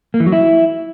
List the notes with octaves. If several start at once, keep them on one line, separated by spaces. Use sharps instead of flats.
A#3
E3
F#3
E4